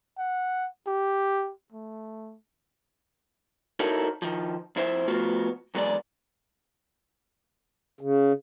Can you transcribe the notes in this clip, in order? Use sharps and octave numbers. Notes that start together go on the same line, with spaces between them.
F#5
G4
A3
D#4 E4 F#4 A4 A#4 C#5
D#3 F3
F2 E4 C5 E5
F3 A3 B3 F4 F#4
E2 F#3 G#3 D5
C#3